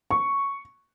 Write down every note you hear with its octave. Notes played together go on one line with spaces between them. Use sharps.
C#6